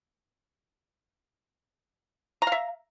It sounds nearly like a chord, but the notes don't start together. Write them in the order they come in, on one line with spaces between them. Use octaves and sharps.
A#5 F5 E5